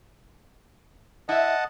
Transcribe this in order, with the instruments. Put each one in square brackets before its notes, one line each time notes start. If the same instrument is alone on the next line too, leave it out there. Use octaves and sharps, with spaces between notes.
[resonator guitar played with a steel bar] E4 E5 [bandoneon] D#5 F#5 A5